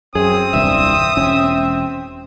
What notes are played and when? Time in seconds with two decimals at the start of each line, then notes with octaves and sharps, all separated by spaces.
0.15 F#2 C4 G#4 D#6
0.54 D#1 C2 G2 E5
1.17 E1 C#4